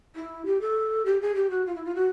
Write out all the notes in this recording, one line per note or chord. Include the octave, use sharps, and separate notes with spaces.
E4
G4
A4
G4
G#4
G4
F#4
F4
E4
F4
F#4